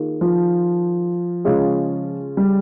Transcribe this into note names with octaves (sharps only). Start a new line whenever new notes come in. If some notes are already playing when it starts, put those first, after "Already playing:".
Already playing: D#3 A#3 F4 G#4
F3
C#3 G#3 C#4 F4 G#4
G3